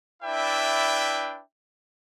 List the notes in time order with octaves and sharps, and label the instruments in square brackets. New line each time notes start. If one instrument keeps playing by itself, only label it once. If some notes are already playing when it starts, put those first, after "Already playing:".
[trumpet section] D4 E4 B4 D5 E5 G5